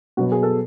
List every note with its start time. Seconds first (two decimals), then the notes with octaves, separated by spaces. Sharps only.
0.17 B2 F#3 B3 F#4
0.32 G#4
0.43 A4